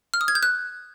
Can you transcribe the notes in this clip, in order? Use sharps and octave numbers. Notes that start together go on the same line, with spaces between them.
F6
D#6
G#6
G6
F#6